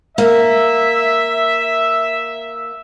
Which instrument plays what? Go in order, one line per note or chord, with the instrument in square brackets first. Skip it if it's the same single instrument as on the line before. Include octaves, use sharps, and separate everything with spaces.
[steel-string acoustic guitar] A#3 [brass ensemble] E5